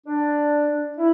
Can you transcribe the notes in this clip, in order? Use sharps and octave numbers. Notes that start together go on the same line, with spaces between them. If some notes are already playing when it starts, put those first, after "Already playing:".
D4
E4